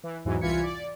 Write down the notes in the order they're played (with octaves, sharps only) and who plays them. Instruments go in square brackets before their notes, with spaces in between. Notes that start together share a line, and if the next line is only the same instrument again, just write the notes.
[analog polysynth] E3
E2 G#2 E3 F#3
C2 E3 F4 G#6 B6 C#7
D5